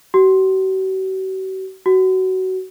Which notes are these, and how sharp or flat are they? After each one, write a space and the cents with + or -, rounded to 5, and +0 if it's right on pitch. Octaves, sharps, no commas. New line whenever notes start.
F#4 +45
F#4 +20